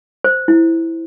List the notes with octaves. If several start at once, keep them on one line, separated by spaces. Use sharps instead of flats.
C5
E4